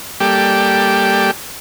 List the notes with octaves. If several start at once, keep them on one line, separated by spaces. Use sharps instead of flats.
G3 A#3 G4 A4 D5 G5